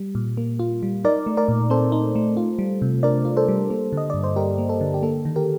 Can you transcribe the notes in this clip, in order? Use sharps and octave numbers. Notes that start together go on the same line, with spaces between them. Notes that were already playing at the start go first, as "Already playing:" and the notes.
Already playing: G3
A#2
A#3
F4
G3
D#4 A#4 D5
A3
A#4 D5
A#2
C4 A4 C5
D#4
A3
F4
G3
C3
D4 A#4 D5
F4
A4 C5
G3
A#3
D3 D#5
G2 D5
C5
G3 G4 A#4
A#3
A4
D3
G4
A#3 A4
D#3
G4 A#4